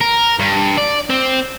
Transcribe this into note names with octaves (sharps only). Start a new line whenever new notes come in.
A#4
G2
D5
C4